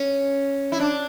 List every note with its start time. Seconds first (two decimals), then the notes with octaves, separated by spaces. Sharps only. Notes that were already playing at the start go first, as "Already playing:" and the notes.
Already playing: C#4
0.72 E4
0.80 D4